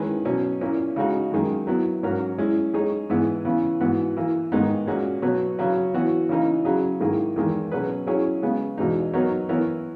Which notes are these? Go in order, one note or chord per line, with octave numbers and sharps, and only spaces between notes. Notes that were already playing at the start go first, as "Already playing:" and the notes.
Already playing: D#3 G#3 C#4 E4 B4
B2 F#3 C#4
A#2 A#3 C#4 E4
C#3 G#3 D#4 F#4
F#2 D#3 G#3
F#3 B3 E4
G#2 F#3 C#4 F#4 A#4
G#3 C#4 E4
G#3 D#4 G#4 C#5
G#2 E3 B3 E4 G#4
C#3 E3 B3
G#2 E3 B3 F#4
E3 A#3 E4
G#2 D#3 G#3 B3 D#4
A#2 G#3 C#4 F#4
B2 F#3 B3 F#4 C#5
C#3 F#3 C#4 F#4
E3 B3 F#4 C#5
C#3 E3 A#3 D#4
C#3 F#3 C#4 G#4
G#2 D#3 A#3 E4 G#4
E2 D#3 G#3
B2 F#3 C#4 G#4 B4
F#3 C#4 E4 G#4 C#5
C#3 G#3 B3
E2 B2 G#3 D#4
F#3 B3 D#4 A#4 C#5
E3 B3 E4 A#4 C#5